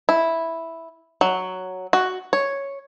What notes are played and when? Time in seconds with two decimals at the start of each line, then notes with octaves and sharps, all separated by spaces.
0.09 E4
1.21 F#3
1.93 F#4
2.33 C#5